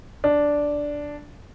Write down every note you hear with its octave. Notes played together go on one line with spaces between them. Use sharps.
D4